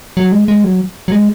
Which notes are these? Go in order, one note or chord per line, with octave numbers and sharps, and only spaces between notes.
F#3
G#3
G#3
F#3
F#3
G#3